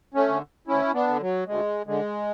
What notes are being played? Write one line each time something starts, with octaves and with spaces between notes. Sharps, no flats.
A3 C#4
D3
D2 C#4 E4
B3 D4
D3
F#3
D2 G#3
D3 G#3